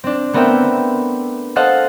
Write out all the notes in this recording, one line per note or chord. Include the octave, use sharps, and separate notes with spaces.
C4 D4
A3 B3 C4 A#4 E5 G5
A4 C5 D#5 F5 F#5 A5